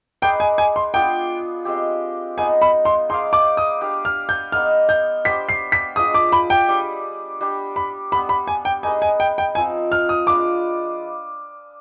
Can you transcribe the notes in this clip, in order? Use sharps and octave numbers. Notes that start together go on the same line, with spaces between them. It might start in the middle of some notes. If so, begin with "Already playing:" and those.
D#4 G#4 B4 D5 G5
G#5
G#5
C6
B3 D4 F4 G#4 G5
G#3 C4 G4
G#3 B3 D#4 G#5
B5
C6
D#4 G#4 D5 F5 C6
D6
D#6
D4 G4 D5 F5
F6
G6
G#3 B3 D#4 F6
G6
B3 D4 G4 C5 B6
C7
B6
F3 G#3 D4 G#4 D#6
D6
B5
G5
G3 D4 G#4 D5
G3 D4 G4
B5
G3 B3 D4 B5
B5
G#5
G5
D#4 G#4 B4 D#5 G#5
G#5
G5
G5
F3 C4 D#4 G#5
F6
D#6
G#3 D4 F4 B4 D6